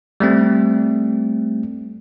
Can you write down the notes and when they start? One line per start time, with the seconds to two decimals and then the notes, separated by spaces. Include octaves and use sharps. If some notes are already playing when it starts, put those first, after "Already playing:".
0.20 G3 A3 C4